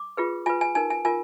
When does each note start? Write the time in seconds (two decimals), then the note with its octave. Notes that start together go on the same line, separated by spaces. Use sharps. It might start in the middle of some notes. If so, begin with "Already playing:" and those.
Already playing: D6
0.17 F4 G#4 B4
0.46 F4 B4 G#5
0.61 G#5
0.75 D#4 A#4 G#5
0.90 G#5
1.05 F4 A#4 G#5